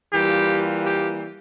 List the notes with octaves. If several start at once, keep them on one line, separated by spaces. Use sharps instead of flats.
E3 G3 A#3 F4 G4
G4